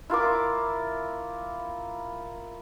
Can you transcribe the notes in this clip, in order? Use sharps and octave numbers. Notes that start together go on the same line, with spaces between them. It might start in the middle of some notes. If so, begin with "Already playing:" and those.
E4 F4 A#4 D6